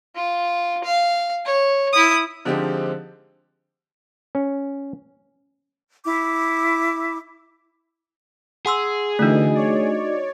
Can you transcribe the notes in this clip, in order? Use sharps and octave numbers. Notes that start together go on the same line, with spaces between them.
F4
F5
C#5
E4 D#6
D3 F3 G#3 C4 D#4 G4
C#4
E4 D6
G#4 F#5 C6 E6
D3 E3 A3 D4 D#4 F#4 D#5
C#5 D5